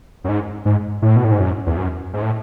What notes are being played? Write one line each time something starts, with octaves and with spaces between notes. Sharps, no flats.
F#2
G#2
G#2
A2
B2
A2
G#2
F#2
E2
F#2
G#2
A2